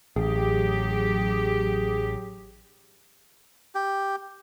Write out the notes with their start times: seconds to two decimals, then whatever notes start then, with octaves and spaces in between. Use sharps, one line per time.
0.16 A1 F#3 G4 G#4
3.75 G4